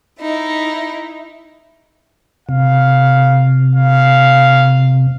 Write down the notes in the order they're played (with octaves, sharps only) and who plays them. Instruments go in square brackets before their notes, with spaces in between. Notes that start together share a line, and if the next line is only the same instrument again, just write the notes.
[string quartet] D#4 E4
[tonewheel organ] C3 [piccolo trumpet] F5
[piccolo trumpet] F5